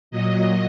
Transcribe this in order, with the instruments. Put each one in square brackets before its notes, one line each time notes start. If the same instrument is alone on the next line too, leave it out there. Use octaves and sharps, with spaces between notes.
[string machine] A#2 F#3 D#5